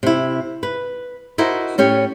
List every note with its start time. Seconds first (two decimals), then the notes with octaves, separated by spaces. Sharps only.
0.03 C3 E4
0.63 B4
1.38 D#4 E4 F#4 A#4 C5
1.78 A2 C#4 G4 C#5